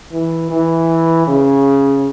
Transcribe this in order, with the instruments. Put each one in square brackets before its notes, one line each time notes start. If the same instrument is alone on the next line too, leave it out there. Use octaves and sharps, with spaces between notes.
[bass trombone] E3
E3
C#3